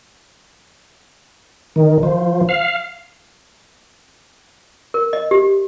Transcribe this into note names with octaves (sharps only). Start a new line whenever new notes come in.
D#3
F3
F5
A#4
D#5
G4